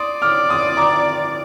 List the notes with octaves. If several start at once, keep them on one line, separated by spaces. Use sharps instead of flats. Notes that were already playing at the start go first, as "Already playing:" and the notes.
Already playing: D5 C6 D#6
D6 F6
C6 D#6
A#5 D6